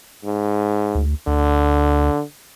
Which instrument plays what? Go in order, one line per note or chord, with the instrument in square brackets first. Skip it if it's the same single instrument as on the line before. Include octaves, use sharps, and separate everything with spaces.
[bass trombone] G#2
[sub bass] D2
[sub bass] D2 [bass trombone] D3